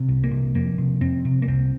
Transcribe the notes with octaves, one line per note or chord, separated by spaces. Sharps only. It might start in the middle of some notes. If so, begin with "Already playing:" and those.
Already playing: C3
C2
A#3
C3
F2 A#3
C3
F2 C4
C3
A#3
C2 C4